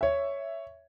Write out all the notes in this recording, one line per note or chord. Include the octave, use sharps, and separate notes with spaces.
C#5 E5